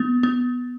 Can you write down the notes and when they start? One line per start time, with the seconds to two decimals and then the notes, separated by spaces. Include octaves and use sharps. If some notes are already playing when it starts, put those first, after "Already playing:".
Already playing: B3
0.23 B3